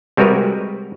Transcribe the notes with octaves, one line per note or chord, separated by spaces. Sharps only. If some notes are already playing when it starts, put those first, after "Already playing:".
C3 G3 G#3 F#4 A#4 B4